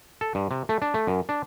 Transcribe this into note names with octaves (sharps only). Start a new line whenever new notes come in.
A4
G2
C3
A3
D4
A3
F#2
D4